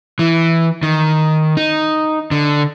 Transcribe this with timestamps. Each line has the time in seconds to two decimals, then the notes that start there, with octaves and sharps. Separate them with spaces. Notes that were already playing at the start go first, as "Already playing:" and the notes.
0.19 E3
0.83 D#3
1.57 D#4
2.31 D3